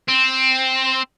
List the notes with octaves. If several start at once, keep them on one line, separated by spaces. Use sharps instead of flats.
C4